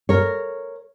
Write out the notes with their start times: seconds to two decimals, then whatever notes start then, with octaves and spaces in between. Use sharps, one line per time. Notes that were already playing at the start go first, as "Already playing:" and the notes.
0.09 A#4 C#5